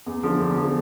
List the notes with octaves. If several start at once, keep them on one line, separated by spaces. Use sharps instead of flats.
E2
D3 F3
E2
D3 F3